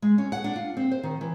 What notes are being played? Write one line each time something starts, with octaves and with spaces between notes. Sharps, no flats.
G#3
C#4
F#5
D4
F4
C4
C5
D#3
E3